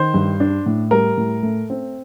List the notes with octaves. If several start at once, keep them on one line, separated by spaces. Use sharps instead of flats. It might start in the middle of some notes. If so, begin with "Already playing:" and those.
Already playing: D#3 C5
G2
D4
A2
G3 A#4
A2
A3
C4